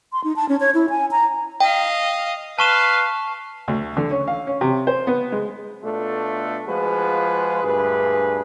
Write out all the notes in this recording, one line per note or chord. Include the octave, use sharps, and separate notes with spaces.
C6
D#4
A5
C#4
C#5
E4
G#5
A#5
D#5 F5 G5
B4 F5 A5 C#6 E7
D2
D3
C#4
F5
C#4
C3
C5
B3
G#3
B2 A3 D4 F4 A4
F3 G#3 F4 F#4 G#4 B4
D2 G2 A#2 G#4 B4